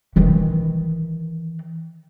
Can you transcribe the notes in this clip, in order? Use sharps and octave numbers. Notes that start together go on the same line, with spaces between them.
D#3 E3